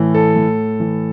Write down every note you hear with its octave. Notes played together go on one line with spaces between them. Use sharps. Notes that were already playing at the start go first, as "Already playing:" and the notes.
Already playing: A2 E3
A4
A2
E3